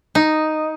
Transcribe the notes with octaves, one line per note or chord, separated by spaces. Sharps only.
D#4